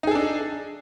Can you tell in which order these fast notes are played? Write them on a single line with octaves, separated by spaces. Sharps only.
D#4 G#4 A4 D4